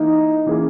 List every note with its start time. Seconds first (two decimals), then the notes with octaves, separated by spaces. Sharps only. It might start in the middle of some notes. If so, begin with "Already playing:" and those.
Already playing: E3 A#3 D#4
0.46 E3 A#3 C#4 G#4